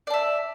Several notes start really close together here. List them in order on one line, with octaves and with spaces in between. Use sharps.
D5 A5 E5